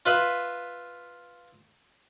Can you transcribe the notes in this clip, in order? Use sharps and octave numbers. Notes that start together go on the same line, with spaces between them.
F4 B4 E5